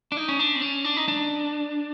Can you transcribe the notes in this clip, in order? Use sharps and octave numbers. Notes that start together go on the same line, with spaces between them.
D4
D#4
C#4
D4
C4
C#4
D4
D#4
D4